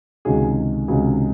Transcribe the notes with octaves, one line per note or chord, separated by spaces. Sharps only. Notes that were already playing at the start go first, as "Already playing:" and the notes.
C#2 C3 D#3 G#3 C#4 F#4 G#4
C#2 C3 D#3 G#3 C#4 F#4 G#4